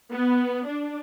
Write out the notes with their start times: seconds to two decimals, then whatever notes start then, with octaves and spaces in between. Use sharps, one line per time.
0.13 B3
0.67 D4